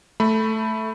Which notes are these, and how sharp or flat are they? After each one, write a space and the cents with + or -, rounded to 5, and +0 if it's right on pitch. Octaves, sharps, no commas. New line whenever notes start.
A3 +0 B5 +0